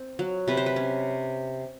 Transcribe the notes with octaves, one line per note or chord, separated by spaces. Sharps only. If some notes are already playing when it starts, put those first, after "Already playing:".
Already playing: C4
F#3
C3 B4
C5
B4
C#4